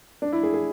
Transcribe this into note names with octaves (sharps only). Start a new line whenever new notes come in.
D4
E4
G#4
G#4